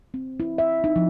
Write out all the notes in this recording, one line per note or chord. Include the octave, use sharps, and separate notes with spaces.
C4
E4
E5
D#4
F3